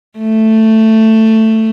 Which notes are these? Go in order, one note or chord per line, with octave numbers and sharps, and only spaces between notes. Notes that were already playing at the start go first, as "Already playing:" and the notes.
A3